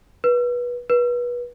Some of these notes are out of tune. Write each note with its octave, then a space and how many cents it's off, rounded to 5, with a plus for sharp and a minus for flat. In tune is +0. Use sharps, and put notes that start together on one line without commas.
B4 -25
B4 -30